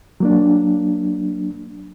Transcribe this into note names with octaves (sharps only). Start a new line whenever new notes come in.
F#3 A#3 D4